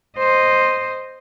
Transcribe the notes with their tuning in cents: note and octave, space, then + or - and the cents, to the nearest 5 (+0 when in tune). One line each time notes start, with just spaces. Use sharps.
C5 +0 D#5 -10